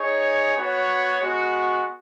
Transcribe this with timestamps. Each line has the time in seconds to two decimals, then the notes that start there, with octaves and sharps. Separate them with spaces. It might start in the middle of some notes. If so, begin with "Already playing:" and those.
Already playing: D#4 G#4 C#5
0.57 B3 F#4 C#5
1.21 G#3 B3 F#4